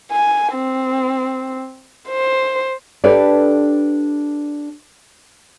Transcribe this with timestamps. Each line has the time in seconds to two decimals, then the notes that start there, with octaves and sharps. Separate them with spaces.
0.11 G#5
0.54 C4
2.09 C5
3.04 D4 G4 A4 B4 D5